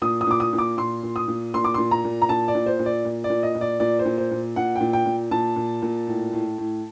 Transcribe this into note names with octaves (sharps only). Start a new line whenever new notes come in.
A#2 D#6
D#6
A#2 D6
D#6
A#2
D6
A#2 C6
A#2
D#6
A#2
A#2 C6
D6
A#2 C6
A#5
A#2
A#5
A#2 A5
D5
A#2
C5
A#2
D5
A#2
D5
A#2
D#5
A#2
D5
A#2 D5
C5
A#2
C5
A#2
A#2 F#5
G5
A#2
G5
A#2
A#2 A5
A#2
A#2
A2
A2
A2